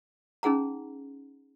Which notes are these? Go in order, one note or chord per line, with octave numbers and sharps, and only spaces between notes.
C#4 D#4 G#4 F#5 A#5